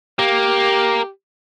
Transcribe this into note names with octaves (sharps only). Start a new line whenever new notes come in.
A#3 G4